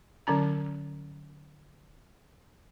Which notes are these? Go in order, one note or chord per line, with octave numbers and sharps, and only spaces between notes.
D3 F#3 C#4 A#5